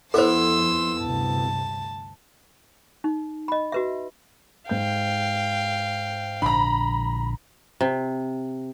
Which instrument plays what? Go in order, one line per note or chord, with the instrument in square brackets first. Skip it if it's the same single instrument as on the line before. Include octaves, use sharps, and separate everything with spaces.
[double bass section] F2 [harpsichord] B3 E4 [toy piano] A4 C5 [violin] C6 E6
[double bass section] D2 G2 C3 [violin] A5
[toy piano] D#4
D#5 B5
F#4 B4 E5
[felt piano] G#2 G6 [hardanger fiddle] F5 G5
[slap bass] A#1 D3 D4 [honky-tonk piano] A#5 B5
[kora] C3